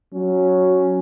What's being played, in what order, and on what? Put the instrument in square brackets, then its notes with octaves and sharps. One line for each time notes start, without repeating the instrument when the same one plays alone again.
[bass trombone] F#3 [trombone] C#4